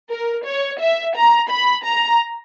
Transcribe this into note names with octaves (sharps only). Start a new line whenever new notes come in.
A#4
C#5
E5
A#5
B5
A#5